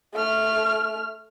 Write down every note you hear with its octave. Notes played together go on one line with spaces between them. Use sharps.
A3 F6